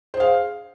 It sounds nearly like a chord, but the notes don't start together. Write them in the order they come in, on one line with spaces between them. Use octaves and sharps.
C5 G#4 F5